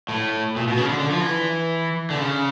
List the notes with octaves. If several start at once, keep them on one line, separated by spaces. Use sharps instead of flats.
A2
A#2
B2
C#3
D3
D3
F3
E3
D3
C#3